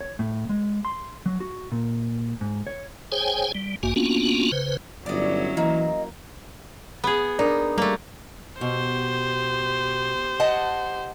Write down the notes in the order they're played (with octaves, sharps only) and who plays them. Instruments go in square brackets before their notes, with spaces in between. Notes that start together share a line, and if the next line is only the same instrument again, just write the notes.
[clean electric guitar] C#5
A2
G#3
C6
F#3
F#4
A#2
G#2
C#5
[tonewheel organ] G#4 C5 C#5 G5 G#5
G3
A1 G2 A#3 F#4 G#5
A#3 B3 C#4 D4 F4 F#4
C#3 B4 C5
[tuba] G1 [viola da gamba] F#3 C#4 E4 [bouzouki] D5 D#5
[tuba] E3 [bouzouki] A#3 [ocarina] D#5
[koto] B3 G#4
[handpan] D4 A#4 D5 [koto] D#4
[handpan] G3 D5 [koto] A3 A#3
[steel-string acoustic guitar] B2 [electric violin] G4 C5
[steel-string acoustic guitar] D#5 F#5 A5